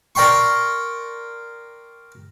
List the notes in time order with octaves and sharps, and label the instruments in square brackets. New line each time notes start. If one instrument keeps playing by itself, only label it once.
[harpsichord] A#4 D5 G5 C6 C#6